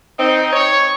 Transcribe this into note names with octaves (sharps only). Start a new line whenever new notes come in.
C4 D#4
C#5